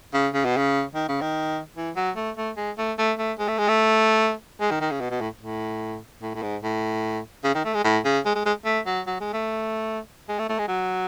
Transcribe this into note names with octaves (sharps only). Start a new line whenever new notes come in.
C#3
C#3
B2
C#3
D#3
C#3
D#3
E3
F#3
A3
A3
G#3
A3
A3
A3
G#3
A3
G#3
A3
G#3
D#3
D#3
C#3
B2
B2
A2
A2
A2
A2
G#2
A2
C#3
D#3
A3
G#3
A2
C#3
G#3
G#3
G#3
A3
F#3
F#3
G#3
A3
G#3
A3
A3
G#3
F#3